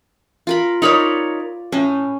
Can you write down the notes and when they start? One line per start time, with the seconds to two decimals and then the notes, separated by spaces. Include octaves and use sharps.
0.47 F4 A#4 B5
0.82 D#4 A#4 C#5 D5 B5
1.72 A2 C#4